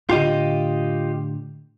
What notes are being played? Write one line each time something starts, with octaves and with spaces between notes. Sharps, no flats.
A2 D3 F4 G4 D#5